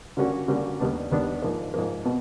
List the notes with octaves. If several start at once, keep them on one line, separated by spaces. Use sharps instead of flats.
D3 G3 A#3 C#4 F#4
D3 G3 A#3 C#4 F#4
D#2 D#3 G3 B3 D4
D#2 D#3 G3 B3 D4
G#2 F3 A#3
G#2 F3 A#3
B2